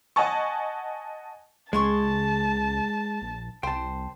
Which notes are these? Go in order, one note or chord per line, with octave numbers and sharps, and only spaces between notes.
D#5 F#5 G#5 A5 C#6
C#2 G#3 G#4 A5 C6 C#6
A#1
C2 C5 G5 A5